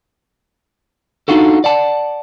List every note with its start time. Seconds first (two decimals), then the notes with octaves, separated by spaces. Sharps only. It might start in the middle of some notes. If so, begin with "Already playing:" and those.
1.28 D4 D#4 F4 F#4 A4
1.64 D5 F#5 A5